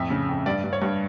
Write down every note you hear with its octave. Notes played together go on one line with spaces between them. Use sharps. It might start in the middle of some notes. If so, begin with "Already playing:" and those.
Already playing: F2 A2 E5
C#3
F2
G2 D5
G2
C#5
G2